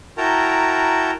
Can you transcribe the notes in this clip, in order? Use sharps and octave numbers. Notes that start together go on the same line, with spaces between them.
E4 F#4 A#4 G5 A5 A#5